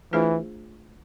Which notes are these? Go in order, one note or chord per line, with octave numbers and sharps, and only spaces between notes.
E3 A3 D4 F4 G#4 C5